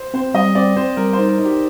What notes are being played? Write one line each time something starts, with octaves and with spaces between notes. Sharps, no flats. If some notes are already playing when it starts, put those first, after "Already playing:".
Already playing: C5
C4 C5
G3 D#5
C4 D5
C4 C5
G3 A#4
C5
D#4
A#4
D#4
G4